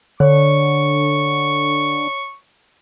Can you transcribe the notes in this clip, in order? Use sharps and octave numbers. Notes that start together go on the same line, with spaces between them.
D3 C#5 C#6